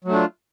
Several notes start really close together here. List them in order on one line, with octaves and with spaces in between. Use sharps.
F#3 A3 D4 F4